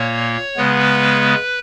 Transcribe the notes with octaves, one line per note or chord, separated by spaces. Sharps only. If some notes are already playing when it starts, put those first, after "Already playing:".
Already playing: A#2 A#3 C#5
C#3 G#3 B3 B4